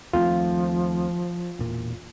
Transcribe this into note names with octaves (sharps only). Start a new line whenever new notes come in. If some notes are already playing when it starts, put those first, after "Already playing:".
D#2 F3 A3 C4 F4
E1 A#2